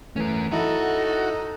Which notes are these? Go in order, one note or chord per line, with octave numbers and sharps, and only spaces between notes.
E3 A3 C#4 A#4
D#4 E4 F#4 A4 E5